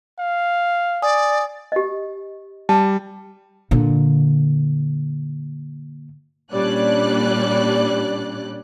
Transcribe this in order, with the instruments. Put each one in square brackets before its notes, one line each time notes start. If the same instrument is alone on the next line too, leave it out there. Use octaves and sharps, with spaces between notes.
[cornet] F5
[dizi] D5 [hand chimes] G#5 D#6
[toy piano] G4 D#5
[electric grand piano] G3 [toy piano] A5
[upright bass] A#2 D3
[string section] A#2 G3 C#4 D4 D5 F#6